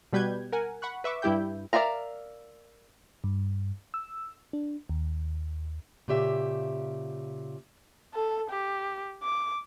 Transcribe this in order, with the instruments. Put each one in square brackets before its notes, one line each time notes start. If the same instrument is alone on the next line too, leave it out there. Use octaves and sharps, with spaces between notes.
[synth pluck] B2 G3 B4 G6 G#6
A#4 F#5 G#5
F#5 B5 C#6 F#6
B4 E5 C#6 D6
G2 G3 E4 G4 G5 G6
[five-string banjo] A#4 D5 E5 F5 A#5
[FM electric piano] G2
E6
D4
D#2
[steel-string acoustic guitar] A#2 C#3 G4 E5
[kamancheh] A4
G4
D6